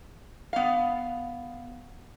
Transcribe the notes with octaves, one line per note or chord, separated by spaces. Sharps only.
B3 F5